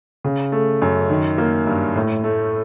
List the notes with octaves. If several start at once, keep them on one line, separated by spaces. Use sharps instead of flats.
C#3
A3
F#2
D#3
A#3
G2
A2
A3